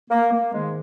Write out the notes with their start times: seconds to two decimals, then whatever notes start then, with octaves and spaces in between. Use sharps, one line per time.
0.11 A#3
0.32 A#3
0.53 G#2 D#3 G#3